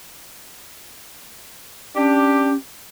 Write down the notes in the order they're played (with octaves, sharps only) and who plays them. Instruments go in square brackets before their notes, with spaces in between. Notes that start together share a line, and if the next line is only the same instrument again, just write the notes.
[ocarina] C#4 [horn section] D4 G4